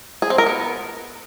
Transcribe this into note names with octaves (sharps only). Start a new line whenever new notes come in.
G#4
C4
A#4
B3